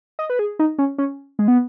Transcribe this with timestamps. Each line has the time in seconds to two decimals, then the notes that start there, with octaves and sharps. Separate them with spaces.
0.19 D#5
0.30 B4
0.39 G#4
0.59 D#4
0.78 C#4
0.98 C#4
1.39 G#3
1.48 B3